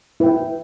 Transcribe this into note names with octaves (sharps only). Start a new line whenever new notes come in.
E4 B4 E5 G5